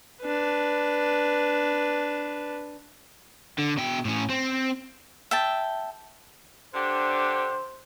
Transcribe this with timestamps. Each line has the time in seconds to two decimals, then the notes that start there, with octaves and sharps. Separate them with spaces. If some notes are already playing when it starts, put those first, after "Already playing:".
0.22 D4 B4
3.59 D3
3.77 B2 G5
4.05 A2 C#4
4.29 C4
5.31 E5 G5 A5
6.74 D3 D4 G4 C5